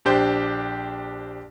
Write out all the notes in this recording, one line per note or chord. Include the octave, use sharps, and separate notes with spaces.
A#1 D4 G4 C5 G6